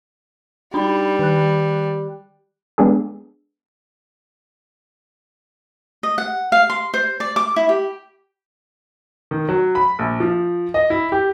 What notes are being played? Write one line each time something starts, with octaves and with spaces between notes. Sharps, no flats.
G3 D4 D#4 B5
D#3 F#6
G#3 B3 D4 G#4 A4
D#5
F#5
F5
C6
C5
D5
D6
E4
G4
D#3
F#3
B5
A#1
F3
D#5
E4
G4